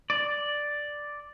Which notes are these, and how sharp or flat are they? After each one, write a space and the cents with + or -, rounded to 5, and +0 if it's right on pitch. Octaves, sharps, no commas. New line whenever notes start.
D5 +0